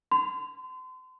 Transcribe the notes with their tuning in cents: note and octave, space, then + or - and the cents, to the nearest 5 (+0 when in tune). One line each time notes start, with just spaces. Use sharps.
C6 -35